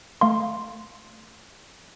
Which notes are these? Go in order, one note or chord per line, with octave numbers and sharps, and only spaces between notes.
A3 F5 C6